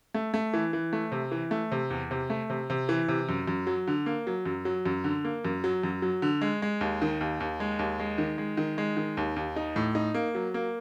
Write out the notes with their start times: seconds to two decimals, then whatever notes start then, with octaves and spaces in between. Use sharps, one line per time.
0.14 A3
0.34 A3
0.53 E3
0.73 E3
0.93 A3
1.12 C3
1.31 E3
1.51 A3
1.72 C3
1.90 E2
2.11 C3
2.30 A3
2.50 C3
2.70 C3
2.89 E3
3.08 C3
3.29 F#2
3.47 F#2
3.67 F#3
3.87 D3
4.06 A#3
4.27 F#3
4.46 F#2
4.65 F#3
4.86 F#2
5.04 D3
5.24 A#3
5.45 F#2
5.64 F#3
5.83 F#2
6.02 F#3
6.22 D3
6.41 G#3
6.62 G#3
6.81 D#2
7.02 D#3
7.21 D#2
7.40 D#2
7.60 G#3
7.79 D#2
8.00 G#3
8.18 D#3
8.38 G#3
8.57 D#3
8.78 G#3
8.97 D#3
9.17 D#2
9.36 D#2
9.56 D#4
9.76 A2
9.95 D#4
10.14 A#3
10.35 F#3
10.54 A#3